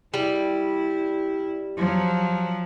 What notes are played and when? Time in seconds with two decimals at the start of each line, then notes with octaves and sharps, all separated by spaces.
0.14 G3 E4
1.77 F3 F#3